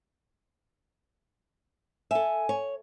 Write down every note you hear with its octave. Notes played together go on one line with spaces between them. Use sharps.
A4 E5 G#5
C#5